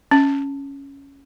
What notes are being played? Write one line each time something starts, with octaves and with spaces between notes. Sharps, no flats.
C#4